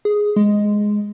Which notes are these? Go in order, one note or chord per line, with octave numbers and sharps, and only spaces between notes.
G#4
G#3